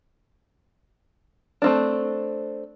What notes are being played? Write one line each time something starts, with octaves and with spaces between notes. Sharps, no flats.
A3 C4 D4